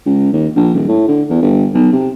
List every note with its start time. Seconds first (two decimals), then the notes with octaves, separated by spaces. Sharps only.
0.06 C#2
0.32 D#2
0.56 A#1
0.75 D#1
0.88 A2
1.08 D3
1.30 E2
1.42 G1
1.74 B1
1.93 C3